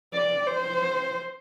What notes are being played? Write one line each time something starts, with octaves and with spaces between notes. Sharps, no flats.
D5
C5